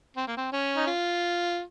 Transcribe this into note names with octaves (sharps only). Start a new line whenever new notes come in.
C4
A#3
C4
C#4
D#4
F4